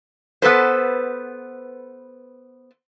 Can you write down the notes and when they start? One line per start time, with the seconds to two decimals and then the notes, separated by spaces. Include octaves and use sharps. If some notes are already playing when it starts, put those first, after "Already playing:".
0.42 B3 A4 B4 C5